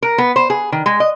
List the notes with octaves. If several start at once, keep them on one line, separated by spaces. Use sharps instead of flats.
A#4
B3
C5
G#4
D#3
G#3
D#5